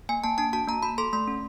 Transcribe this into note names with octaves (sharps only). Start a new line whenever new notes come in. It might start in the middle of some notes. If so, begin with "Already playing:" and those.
A#3 G#5
A#3 A5
D4 A5
F#4 A5
A#3 A#5
F#4 B5
A4 C6
A3 C6
C#4